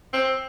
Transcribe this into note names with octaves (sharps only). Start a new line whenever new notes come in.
C4